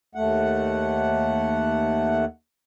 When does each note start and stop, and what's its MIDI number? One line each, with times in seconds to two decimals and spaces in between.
0.15 2.25 39
0.15 2.25 57
0.15 2.25 78